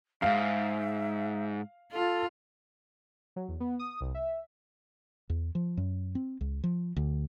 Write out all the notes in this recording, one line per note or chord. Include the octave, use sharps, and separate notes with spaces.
F2 G#2 E5 F5
F4 A4
F#3
E2
B3
D#6
C2
E5
E2
F3
F#2
C4
C#2
F3
D2